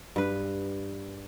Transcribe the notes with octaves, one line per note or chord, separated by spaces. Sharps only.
G2 B4